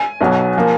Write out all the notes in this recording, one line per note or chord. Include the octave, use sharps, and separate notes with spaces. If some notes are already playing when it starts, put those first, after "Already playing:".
Already playing: G#5
B1 B2 F#3
F3 A#3